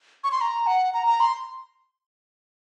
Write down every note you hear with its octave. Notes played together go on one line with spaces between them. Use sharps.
C#6
C6
A#5
F#5
A#5
A#5
C6